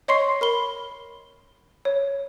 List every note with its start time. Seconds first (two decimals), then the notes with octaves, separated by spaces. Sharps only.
0.08 C#5 D#5 C6 C#6 C7
0.41 A#4 B5 G7
1.85 C#5